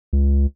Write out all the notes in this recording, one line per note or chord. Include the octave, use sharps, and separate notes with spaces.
C#2